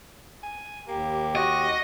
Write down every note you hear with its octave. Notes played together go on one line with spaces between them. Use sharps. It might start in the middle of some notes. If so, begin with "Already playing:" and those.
G#5
D#2 A#3 G4
F#4 D#5